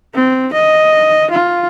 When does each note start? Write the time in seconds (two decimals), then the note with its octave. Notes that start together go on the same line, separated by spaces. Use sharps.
0.15 C4
0.54 D#5
1.31 F4